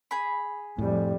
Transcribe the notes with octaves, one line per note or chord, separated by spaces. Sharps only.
G#4 B5
F2 A2 G3